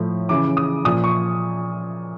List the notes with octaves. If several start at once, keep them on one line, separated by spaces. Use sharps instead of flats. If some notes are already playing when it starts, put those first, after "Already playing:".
Already playing: A2 F3
C#3 E3 D6
D#6
A#2 F3 D#6
C#6